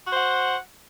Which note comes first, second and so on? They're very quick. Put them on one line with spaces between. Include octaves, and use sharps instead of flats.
F#4 C5 F#5